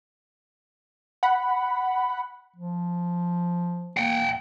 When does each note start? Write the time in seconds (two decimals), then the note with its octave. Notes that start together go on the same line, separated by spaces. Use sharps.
1.23 F#5 B5
2.56 F3
3.97 A#3 F#5 G5